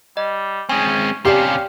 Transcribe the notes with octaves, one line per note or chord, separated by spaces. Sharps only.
G3 D#5
G#3 C4 C#4 G#5
C3 C#4 G4 D5 F5 G5 C7